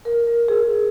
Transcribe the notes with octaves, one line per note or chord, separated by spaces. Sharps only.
A#4
A#4
G#4